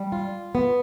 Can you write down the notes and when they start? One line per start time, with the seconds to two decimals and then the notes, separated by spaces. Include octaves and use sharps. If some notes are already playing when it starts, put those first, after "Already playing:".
Already playing: G3
0.12 F4
0.55 B3